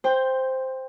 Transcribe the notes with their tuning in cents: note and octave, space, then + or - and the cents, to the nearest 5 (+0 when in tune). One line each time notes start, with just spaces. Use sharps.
C5 +0 G5 +15